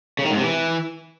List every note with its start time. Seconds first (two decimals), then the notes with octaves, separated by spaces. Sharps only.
0.19 C#3
0.25 D#3
0.31 G#2
0.37 C3
0.43 E3